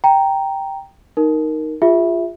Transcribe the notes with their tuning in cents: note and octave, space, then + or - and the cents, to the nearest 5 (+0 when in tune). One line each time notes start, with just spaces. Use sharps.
G5 +0 A#5 +0
D#4 +0 A#4 +0
F4 +0 G#4 -35 E5 +0